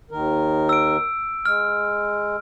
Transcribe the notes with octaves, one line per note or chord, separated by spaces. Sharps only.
D#2 D#3 A#4
E6 D7
G#3 F6